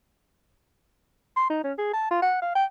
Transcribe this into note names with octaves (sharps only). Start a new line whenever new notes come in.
C6
D#4
C#4
G#4
A5
F4
F#5
F5
G5